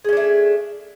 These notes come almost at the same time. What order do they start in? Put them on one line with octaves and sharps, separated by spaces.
G#4 C#4 D4 A3